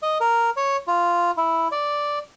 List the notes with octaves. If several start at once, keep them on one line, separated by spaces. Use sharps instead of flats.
D#5
A#4
C#5
F4
E4
D5